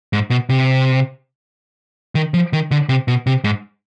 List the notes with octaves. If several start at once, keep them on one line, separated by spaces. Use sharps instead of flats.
G#2
B2
C3
D#3
F3
D#3
D3
C3
B2
C3
G#2